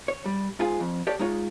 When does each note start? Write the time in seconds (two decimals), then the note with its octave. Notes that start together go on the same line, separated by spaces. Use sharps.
0.08 C#5
0.26 G3
0.59 G#2 F4 G#4
0.80 F2
1.07 G4 A4 C#5 D5
1.19 G#3 D#4 F4 C#5